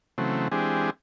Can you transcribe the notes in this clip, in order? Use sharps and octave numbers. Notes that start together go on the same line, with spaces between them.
C#3 E3 F#3 A3 C4
E3 G#3 C4 D4 G4 G#4